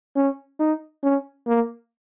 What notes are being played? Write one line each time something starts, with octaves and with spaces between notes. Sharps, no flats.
C#4
D#4
C#4
A#3